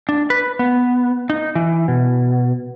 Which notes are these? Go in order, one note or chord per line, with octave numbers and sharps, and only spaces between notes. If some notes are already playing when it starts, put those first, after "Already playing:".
D4
B4
B3
D#4
E3
B2